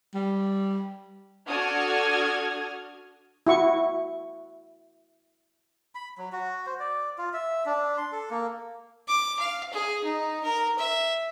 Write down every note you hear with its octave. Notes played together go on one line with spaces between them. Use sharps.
G3
D4 F#4 A4 D#6 F6 G#6
E4 F#4 C#6
B5
F#3
F#4
C5
D5
F4
E5
D4
C6
A4
A#3
D6
F5
G#4
D#4
A#4
E5